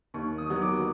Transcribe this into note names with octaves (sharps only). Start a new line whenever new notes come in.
D#2 C#6
D#6
D#3 F#3 B3
D6